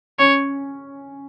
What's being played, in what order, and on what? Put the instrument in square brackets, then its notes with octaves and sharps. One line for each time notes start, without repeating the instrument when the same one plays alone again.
[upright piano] C#4 [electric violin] C#5